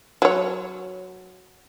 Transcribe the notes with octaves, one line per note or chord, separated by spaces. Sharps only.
F#3 C#5